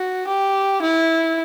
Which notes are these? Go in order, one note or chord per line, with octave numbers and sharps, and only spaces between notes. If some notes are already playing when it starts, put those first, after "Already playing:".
Already playing: F#4
G4
E4